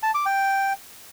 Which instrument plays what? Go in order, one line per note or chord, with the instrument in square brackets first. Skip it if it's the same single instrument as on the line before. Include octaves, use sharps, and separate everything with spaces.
[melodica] A5
D6
G5